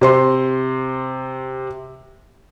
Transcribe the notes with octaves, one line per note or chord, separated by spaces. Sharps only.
C3 C5 C6